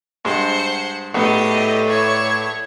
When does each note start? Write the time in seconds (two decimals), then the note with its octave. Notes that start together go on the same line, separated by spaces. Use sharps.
0.25 G2 G#3 C5 F#5
1.14 A#1 A2 A3 B3 G4 D5 D#5
1.88 E4 C#5